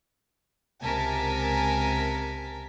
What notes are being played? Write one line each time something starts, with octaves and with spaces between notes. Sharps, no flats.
C#2 C3 A#4 G#5 A5 B6